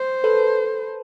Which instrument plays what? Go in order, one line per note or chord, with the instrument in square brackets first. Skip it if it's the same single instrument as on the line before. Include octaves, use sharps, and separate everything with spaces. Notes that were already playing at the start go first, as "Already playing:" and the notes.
Already playing: [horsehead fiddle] C5
[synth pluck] A4 B4